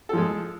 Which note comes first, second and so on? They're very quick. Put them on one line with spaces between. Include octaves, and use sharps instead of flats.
A4 F3 G#3